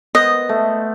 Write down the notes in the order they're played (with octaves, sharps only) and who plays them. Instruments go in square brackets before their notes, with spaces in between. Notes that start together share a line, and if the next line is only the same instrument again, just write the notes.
[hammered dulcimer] B3 C5 [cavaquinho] D#5
[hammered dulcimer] A3